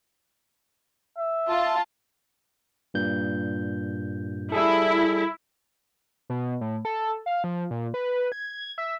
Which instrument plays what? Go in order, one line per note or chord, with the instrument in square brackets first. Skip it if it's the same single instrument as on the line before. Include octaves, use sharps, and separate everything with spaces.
[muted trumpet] E5
[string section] F4 A5
[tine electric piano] G2 A#2 G6
[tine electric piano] G3 G#4 A4 [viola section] E4
[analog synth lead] B2
A2
A4
F5
F3
A#2
B4
G#6
E5